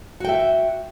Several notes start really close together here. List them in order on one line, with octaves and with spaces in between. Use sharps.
F#4 G5 E5